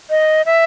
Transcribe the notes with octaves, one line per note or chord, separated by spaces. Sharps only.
D#5
E5